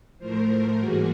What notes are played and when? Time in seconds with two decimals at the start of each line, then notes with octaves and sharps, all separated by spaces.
0.19 A2 F3 A3 A#4 C5
0.77 G#2 E3 G3 A#3 F#4 G#4